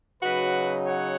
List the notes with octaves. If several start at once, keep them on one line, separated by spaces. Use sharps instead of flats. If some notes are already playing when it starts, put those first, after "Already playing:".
C#3 F#3 D#4 F#4 B4
C#5 F#5